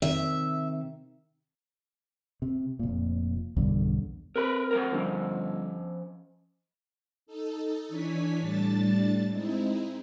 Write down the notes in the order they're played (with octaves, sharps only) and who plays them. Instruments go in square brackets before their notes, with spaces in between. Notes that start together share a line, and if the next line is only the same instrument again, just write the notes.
[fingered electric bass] C3 D#3 [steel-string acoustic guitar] E5
[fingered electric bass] C3
F1 A#2
B1 E2 G2 D3
[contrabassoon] C3 [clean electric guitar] A#4 B4 B5
[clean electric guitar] F#3 B3 A#4
[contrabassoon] G1 [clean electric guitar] F3 C#4
[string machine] D#4 A4
E3 D4 C#5 G#5 B6
A2 G3 D4 A5 A6
G#3 C4 D#4 E4